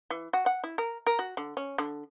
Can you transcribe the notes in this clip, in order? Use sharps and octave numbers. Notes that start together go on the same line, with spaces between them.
E3
F#4
F#5
E4
A#4
A#4
F#4
D3
C#4
D3